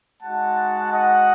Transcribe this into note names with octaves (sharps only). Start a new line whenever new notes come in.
G#3 D#4 F#4 F#5 A5
D#5 F#5